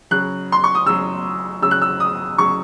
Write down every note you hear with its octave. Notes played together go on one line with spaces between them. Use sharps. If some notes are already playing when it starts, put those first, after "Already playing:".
C#3 F#3 F#6
C6
C#6
D#6
C#3 F#3 E6
C#3 F#3 E6
F#6
E6
D#6
C#3 F#3 C#6